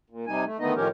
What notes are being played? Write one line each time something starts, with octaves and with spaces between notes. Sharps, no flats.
A#2
C3 G3 D#4 G#5
A3
D3 D#3 A3 B3 D#4 D#5
A2 D#3 F3 C#4 G4 A#4